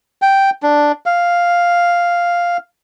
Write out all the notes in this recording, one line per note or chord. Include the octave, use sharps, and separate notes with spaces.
G5
D4
F5